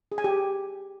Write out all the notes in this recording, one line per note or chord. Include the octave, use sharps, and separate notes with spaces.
G#4
G#5
G4